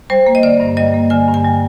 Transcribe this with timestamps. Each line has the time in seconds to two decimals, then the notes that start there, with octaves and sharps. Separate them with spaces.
0.10 G3 C5
0.26 A#3
0.35 D#5
0.43 D3 D5
0.60 G2
0.77 G3 D#5
0.94 A#3
1.10 D3 G#5
1.28 G2
1.34 G#5
1.44 G3